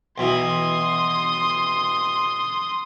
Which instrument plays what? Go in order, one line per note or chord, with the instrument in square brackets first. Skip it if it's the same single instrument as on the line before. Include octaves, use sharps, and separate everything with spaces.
[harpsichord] B1 B2 E3 [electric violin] C6 D#6